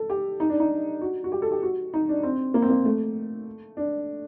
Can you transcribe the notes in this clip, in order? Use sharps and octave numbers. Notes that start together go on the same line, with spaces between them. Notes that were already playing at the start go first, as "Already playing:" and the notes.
Already playing: A4
G4
D#4
D4
D#4
F#4
F#4
G4
A4
G4
F#4
D#4
D4
C4
A#3
C4
A#3
A3
D4